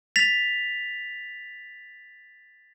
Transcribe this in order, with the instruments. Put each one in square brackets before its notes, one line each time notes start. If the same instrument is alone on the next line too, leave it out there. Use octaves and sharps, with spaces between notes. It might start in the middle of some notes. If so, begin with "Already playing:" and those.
[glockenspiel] A6 B6 F7